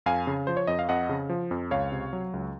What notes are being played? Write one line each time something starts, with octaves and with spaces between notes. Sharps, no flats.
F2 F5 G#5
C#3
F3 C5
C#5
F2 D#5
F5
F2 D#5 F#5
C#3
F3
F2
C#2 C#5 F5
C3
F#3
C#2